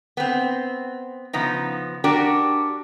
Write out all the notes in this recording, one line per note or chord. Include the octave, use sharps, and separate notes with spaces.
B3 C4
C#3 F3 B3 D#4
D4 F#4 G4 A#4 D5